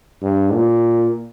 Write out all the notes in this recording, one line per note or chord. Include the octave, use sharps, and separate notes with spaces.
G2
A#2